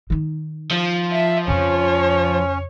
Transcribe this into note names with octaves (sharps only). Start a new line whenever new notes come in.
D#3 D#4
F3
E5
F2 C#3 C#4 C#5